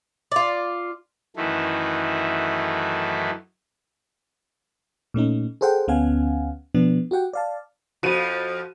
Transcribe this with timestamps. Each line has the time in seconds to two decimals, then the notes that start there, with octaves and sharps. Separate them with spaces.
0.32 F4 D5
1.36 F#2 D#3 E3 A3
5.14 A#2 A3 C#4 D#4
5.61 G#4 A4 C5 F#5 G5
5.88 D2 B3 C#4 F5 F#5 G#5
6.75 B2 F3 B3 D4
7.11 F#4 G4 F#5 G5
7.33 D5 F5 A5
8.03 F2 F3 F#4 D#7